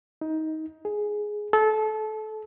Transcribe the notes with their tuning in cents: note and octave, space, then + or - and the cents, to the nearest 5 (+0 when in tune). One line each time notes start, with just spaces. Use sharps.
D#4 +20
G#4 +5
A4 -25